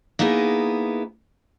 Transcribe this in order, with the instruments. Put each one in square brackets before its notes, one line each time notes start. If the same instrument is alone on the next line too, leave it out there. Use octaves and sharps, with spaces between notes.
[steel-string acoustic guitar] A#3 B3 D#4 E4 G#4